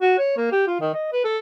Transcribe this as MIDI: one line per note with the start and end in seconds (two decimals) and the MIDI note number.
0.01 0.15 66
0.18 0.35 73
0.37 0.48 58
0.52 0.63 67
0.67 0.80 65
0.80 0.89 51
0.94 1.12 75
1.12 1.22 71
1.24 1.38 69